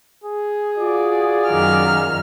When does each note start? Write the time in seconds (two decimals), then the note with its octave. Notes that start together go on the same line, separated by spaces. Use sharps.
0.24 G#4
0.78 F4 F#4 D5
1.47 F#2 D#3 F6